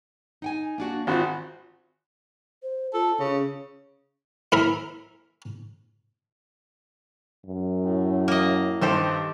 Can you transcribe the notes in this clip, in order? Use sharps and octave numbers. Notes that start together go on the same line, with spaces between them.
D#4 G5 G#5
A#3 D4 F#4
G#1 C4 F4 F#4 B5
C5
F4 A4
C#3 C#4
E4 A#4 B5
F#2
A2
A#3 D#5
G2 D#3 G4 A4 C5